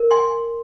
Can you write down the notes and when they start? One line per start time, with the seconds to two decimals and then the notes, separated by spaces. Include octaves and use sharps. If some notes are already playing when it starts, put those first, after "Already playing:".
Already playing: A#4
0.11 G#5 C6